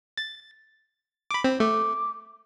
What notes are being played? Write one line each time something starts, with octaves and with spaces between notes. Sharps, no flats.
A6
B5 D6
C4
A3 D6